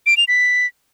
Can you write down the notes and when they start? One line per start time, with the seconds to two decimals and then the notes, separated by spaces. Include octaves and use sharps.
0.06 D7
0.17 F7
0.28 B6